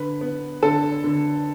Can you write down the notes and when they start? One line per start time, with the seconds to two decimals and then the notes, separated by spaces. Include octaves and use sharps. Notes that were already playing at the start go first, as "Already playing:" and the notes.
Already playing: D3 B4
0.21 B3
0.63 D3 A4 A5
1.04 D3